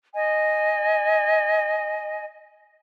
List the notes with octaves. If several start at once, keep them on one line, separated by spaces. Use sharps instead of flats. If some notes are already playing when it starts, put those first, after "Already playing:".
D#5 G#5